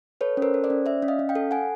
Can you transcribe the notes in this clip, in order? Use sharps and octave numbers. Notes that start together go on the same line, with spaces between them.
A4 B4 C#5
C#4
A#4 C5
A4
C5 D5
C#4
C#4 D5 E5
C#4
D#5 F5
C#4
F5 G5
A4
A4 F#5 G#5